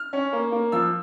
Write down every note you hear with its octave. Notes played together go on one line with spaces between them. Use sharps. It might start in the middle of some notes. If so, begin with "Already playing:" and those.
Already playing: F6
C#4
A#3
A#3
F3 E6